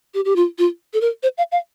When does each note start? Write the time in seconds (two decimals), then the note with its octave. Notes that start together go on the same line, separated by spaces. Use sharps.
0.14 G4
0.25 G4
0.36 F4
0.58 F4
0.94 A4
1.01 A#4
1.23 C5
1.38 F5
1.52 F5